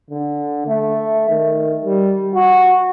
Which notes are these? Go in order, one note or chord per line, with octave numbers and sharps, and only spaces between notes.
D3
A3
D#3
G3
F#4